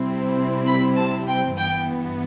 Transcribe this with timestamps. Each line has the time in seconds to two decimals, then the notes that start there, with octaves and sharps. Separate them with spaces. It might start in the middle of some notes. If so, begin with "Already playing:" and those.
Already playing: C3 G3 C4 E4
0.67 B5
0.97 A5
1.28 G5
1.57 G2 E3 B3 G5